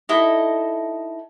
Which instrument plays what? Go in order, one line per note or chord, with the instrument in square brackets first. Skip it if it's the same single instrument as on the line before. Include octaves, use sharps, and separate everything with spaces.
[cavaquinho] D#4 E4 A4 D#5